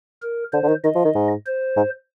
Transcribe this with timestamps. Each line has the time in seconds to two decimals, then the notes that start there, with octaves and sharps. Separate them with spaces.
0.22 A#4
0.53 D3 C5
0.63 D3
0.68 D#3
0.84 D#3 D#5
0.95 F3
1.05 D#3
1.15 G#2
1.46 C5
1.77 G#2